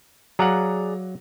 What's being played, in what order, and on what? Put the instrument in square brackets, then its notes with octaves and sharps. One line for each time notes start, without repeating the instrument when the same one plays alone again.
[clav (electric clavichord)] F#3 F5 F#5 [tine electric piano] G#4 D5 [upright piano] A#5